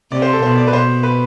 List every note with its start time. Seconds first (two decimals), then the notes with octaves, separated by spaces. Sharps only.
0.12 C3 D5
0.22 C5
0.33 A4
0.43 B2 C5
0.57 D5
0.67 B4
0.73 B2 C5
1.03 B4